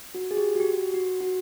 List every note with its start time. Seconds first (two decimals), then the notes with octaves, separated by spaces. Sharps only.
0.15 F#4
0.31 G#4
0.37 G4
0.55 F#4
0.60 G4
0.94 F#4
1.21 F#4